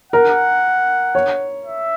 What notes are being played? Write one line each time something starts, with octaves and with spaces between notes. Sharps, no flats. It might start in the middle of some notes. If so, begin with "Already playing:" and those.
A#4 F#5
C#5
E5